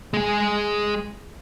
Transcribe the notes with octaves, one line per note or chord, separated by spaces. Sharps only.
G#3 G#4